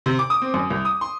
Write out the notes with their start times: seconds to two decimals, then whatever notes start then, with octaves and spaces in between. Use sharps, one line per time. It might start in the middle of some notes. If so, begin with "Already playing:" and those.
0.06 C3
0.19 D6
0.30 D#6
0.42 C4
0.54 F#2
0.70 C2
0.85 D#6
1.01 C6